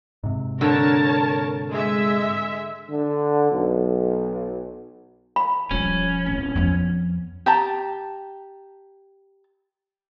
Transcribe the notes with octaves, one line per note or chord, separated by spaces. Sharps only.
G#2 C3
D3 A#4 C#5 A5
G#3 E5
D3
B1
B5
E1 F3 G3 C#4
D1
F2 F3 B3
G4 A5 A#5